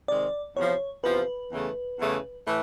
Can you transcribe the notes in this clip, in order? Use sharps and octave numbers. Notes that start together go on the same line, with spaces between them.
C3 D#3 G#3 C4 D5
E2 C3 F3 C#5
E2 C3 F3 B4
E2 C#3 E3 A3
E2 C#3 E3 A3
A2 E3 A3